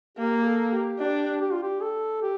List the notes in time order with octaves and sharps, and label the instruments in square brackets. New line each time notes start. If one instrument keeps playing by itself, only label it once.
[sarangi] A#3 [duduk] G4
[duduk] A4
G4
[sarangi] D4 [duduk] G4
[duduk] G4
F4
G4
A4
G4